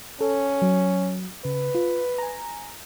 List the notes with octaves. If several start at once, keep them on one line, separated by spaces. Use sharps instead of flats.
C#4 A4
F#3
C#3 B4
F4
G#5 A#5